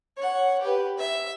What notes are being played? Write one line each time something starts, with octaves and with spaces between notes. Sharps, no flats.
C#5 F#5
G4 B4
E5